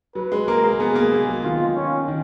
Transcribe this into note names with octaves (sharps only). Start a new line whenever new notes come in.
F#3 B4
G#3
A#3 A#4
G#3
B3 G#4
A#3
G#3
F#3
D#3 F4
C#4
D#3